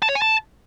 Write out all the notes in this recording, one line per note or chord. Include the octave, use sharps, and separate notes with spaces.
A5
C#5
G#5
A5